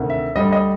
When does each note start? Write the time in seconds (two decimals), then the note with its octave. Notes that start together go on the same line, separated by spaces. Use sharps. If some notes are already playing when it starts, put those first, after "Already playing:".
Already playing: D2 C3 D#3
0.10 E5
0.35 D2 D3 G3 D#5
0.53 D#5